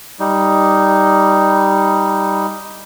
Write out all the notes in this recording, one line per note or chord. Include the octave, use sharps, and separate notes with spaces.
G3 D#4